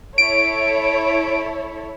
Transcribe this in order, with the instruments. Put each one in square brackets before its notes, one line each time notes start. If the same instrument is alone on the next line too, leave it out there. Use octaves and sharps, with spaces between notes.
[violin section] E4 A4 C#5 [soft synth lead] D7